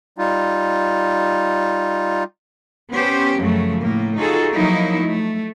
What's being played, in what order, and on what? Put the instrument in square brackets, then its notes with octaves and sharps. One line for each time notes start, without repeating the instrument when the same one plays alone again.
[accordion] G3 D#4 F4
[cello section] B3 C#4 G4 C5
F#2 C#3 F3 F#3 A3
A2 A#3
D#4 F4 F#4 G#4 A4
F3 F#3 A#3 D#4 E4
A3